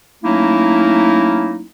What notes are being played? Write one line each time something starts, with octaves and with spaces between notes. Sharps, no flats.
F#3 A3 A#3 C#4 D#4 E4